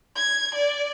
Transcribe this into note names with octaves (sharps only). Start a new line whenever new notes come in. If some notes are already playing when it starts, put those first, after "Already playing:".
G#6
D5